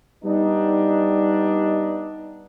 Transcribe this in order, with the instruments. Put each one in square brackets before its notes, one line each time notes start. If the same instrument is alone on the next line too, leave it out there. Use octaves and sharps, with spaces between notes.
[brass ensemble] G3 B3 D4 D#4